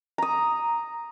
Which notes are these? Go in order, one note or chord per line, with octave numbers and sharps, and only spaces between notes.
A#5 D#6